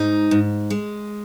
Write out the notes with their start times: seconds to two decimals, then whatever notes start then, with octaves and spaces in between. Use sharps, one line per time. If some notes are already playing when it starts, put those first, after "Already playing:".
Already playing: G#2 D#4
0.31 G#2
0.70 G#3